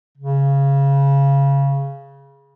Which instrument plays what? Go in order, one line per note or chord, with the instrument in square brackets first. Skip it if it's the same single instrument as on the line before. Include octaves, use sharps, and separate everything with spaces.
[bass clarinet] C#3